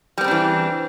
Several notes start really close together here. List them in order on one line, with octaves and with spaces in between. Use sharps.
G3 C4 C#3 D4 E3